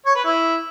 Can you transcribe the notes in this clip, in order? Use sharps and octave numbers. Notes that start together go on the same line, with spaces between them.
C#5
B4
E4